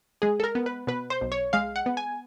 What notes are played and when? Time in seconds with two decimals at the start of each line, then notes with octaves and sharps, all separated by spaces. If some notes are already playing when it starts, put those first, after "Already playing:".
0.22 G#3 G#4
0.40 A4
0.44 A#4
0.55 B3
0.66 B4
0.87 B2 B4
1.10 C5
1.21 B1
1.32 C#5
1.53 G#3 F5
1.76 F#5
1.86 B3
1.97 G#5